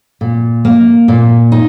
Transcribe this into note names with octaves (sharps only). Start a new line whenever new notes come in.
A#2
A#3
A#2
D#4